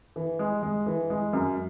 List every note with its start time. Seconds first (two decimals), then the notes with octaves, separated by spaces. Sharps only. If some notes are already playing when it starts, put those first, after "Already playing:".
0.16 E3
0.39 G#3
0.63 G#3
0.87 E3
1.10 G#3
1.33 F#2